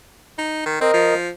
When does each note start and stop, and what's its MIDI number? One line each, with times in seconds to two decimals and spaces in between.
0.38 0.62 63
0.66 0.79 51
0.81 0.93 60
0.81 1.14 70
0.81 1.14 75
0.94 1.30 53